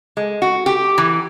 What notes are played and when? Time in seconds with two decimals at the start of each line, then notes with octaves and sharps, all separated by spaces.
0.17 G#3
0.42 F#4
0.66 G4
0.98 E3